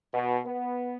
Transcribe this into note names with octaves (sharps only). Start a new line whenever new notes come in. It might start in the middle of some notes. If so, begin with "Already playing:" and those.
B2
B3